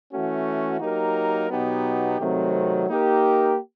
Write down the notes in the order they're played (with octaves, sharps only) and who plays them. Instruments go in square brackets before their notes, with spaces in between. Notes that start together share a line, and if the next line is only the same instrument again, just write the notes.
[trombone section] E3 A3 C#4 F#4
F#3 A#3 D#4 G4 A#4
B2 F#3 B3 D#4 G4
C3 D#3 F#3 A3 C4
A#3 D#4 G4 A#4